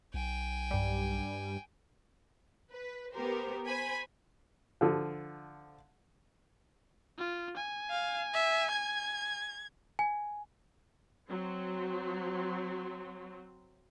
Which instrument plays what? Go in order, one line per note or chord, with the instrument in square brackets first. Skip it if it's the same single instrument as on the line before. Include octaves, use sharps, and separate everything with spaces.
[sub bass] B1 [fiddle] G5 G#5
[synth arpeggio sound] G2 G3
[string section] B4
B3 G4 A#4 C5
C5 G#5 B5
[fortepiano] D3 F3
[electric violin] F4
G#5
[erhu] F5
E5
G#6
[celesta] G#5
[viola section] F#3 C4